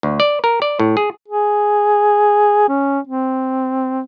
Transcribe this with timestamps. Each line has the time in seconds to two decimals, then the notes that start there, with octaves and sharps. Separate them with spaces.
0.03 D2
0.20 D5
0.44 A#4
0.62 D5
0.80 A2
0.97 G#4
1.28 G#4
2.69 C#4
3.07 C4